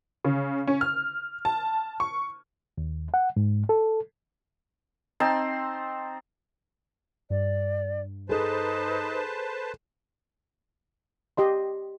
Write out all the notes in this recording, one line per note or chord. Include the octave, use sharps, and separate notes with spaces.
C#3
C#4
F6
A5
C#6
D#2
F#5
G#2
A4
C4 D#4 A5 C6
G2 D5
D#4 G#4 A4 B4 C5 A5
G4 D#5 C6